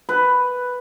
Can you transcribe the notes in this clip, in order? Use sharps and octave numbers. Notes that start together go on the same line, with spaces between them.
B4